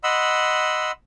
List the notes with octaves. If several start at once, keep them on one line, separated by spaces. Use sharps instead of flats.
D#5 F#5 B5 C6 E6